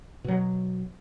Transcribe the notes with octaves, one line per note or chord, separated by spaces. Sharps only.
B2 F#3